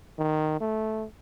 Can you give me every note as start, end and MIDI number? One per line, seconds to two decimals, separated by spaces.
0.18 0.57 51
0.60 1.05 57